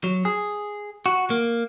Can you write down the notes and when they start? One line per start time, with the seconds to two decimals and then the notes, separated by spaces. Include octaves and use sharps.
0.04 F#3
0.25 G#4
1.06 F#4
1.30 A#3